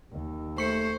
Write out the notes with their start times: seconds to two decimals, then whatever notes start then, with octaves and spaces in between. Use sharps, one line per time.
0.12 D#2
0.58 A3 C5 C#6 C#7